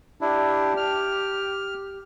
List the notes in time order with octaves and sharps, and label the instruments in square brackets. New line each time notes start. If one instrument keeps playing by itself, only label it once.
[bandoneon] D4 E4 [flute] G4
[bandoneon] F6